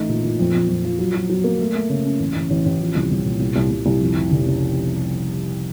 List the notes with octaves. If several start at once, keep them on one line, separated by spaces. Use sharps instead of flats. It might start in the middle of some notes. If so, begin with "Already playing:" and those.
Already playing: A1 A3 D#4
A#2
A#2
F2
F2
F2
F3
F#3
F#3
F#3
A#3
A3
A3
C#3
C#4
A1
A1
A1
A1
F3
C2
C2
A#2
C2
C2
C2
C2
F2
F1
F1
C#3